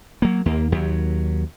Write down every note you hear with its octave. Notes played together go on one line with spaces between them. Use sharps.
F#3 A#3
D#2 A#3
D#2 F#3